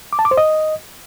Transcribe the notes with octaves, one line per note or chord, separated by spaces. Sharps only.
D6
A5
D6
C5
D#5